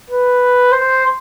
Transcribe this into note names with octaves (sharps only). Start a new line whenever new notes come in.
B4
C5